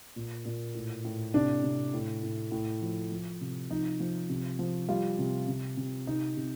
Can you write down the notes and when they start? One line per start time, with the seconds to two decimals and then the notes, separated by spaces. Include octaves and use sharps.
0.16 A#2
0.45 A#2
0.75 A2
1.05 A2
1.34 C3 D4
1.63 C3
1.93 A2
2.23 A2
2.52 A2
2.82 F3
3.12 F3
3.41 C3
3.71 F3 D#4
4.00 F3
4.29 C3
4.59 F3
4.89 G3 F4
5.18 C3
5.48 C3
5.77 C3
6.07 C3 D#4
6.37 C3